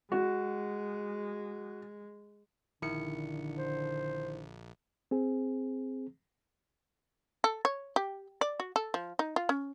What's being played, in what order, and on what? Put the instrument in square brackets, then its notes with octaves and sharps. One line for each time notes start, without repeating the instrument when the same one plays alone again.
[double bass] G#3 [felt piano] F#4
[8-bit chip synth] A#1 [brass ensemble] D3 [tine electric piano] D#3 E4 C#7
[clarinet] C5
[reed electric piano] C4 G#4
[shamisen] A4
C#5
G4
D5
F#4
A4
F3
D#4
F4
C#4